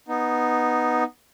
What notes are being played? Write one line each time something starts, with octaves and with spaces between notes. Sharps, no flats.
B3 D#4